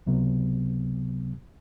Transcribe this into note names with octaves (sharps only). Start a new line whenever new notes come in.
C#2 C3 F#3 B3